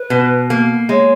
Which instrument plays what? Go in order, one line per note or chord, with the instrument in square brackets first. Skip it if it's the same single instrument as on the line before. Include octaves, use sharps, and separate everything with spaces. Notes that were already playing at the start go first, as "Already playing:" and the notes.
Already playing: [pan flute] B4
[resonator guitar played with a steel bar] B2
A#3
[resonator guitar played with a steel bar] G#3 [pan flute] C#5